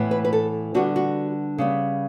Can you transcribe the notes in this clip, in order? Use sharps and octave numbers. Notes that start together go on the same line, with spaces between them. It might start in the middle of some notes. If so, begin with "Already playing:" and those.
Already playing: A2 E3 B3
B4
B4
A4
D3 G3 B3 F#4
F#4
C#3 G3 B3